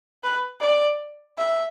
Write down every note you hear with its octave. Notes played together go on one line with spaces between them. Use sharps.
B4
D5
E5